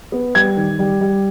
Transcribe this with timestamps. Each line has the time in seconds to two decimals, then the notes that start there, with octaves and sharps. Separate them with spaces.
0.12 B3
0.35 G3 G#6
0.57 D#3
0.79 G3
1.01 G3